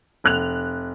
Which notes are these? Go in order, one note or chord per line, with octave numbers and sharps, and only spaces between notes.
F1 F#6 F7